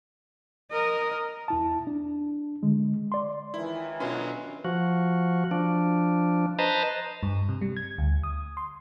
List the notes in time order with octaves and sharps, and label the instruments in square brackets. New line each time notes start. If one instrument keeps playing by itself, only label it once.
[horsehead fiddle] A#4 D#5
[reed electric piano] E2 E4 A5
D4
D3 G#3
D5 C6
[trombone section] C#2 D#3 E3 [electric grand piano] E4
[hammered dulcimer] B2 F4 [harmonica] D3 F#3 C6 [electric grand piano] C#4
[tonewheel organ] F3 F#4
F3 D4
B4 C5 D#5 A5 A#5
[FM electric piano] G2
C3
G3
G#6
D2
D#6
C6